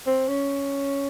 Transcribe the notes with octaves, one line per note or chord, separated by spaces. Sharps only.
C4
C#4